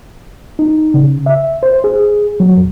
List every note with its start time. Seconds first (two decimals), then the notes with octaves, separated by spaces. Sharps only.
0.59 D#4
0.94 C#3
1.26 E5
1.63 C5
1.84 G#4
2.40 F#3
2.57 F2